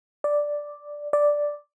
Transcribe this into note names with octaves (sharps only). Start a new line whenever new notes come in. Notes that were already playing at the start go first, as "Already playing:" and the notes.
D5
D5